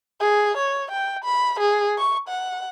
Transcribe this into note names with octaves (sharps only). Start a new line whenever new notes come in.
G#4
C#5
G5
B5
G#4
C#6
F#5